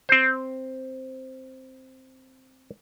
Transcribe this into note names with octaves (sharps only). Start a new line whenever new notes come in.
C4 C5